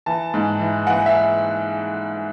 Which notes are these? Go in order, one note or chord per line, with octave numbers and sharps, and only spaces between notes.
E3 A5
G#2
E3
E3 F#5
E5